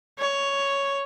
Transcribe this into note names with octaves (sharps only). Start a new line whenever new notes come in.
C#5